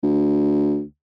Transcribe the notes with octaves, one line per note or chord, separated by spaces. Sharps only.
D2